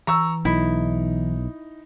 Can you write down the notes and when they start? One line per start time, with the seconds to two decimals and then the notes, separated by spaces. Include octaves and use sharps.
0.07 E3 A#5 C#6 E6
0.45 B1 D#4 E4